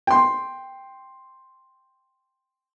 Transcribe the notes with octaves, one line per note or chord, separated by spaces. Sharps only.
G5 C6